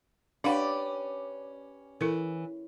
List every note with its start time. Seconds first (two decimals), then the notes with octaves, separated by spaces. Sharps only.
0.44 C#4 D4 G4 B4 D5 F5 F#5
2.01 E3 E4 A4 A#4